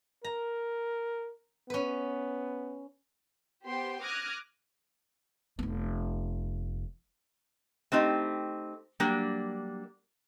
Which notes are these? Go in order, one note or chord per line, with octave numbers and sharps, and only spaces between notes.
A#4 A#5
B3 C#4 B4
B3 G4 C5 G5 C6
D6 D#6 F6 F#6 G#6 A#6
F1 B3
A3 C4 D#4 G4
F#3 G3 A#3 D4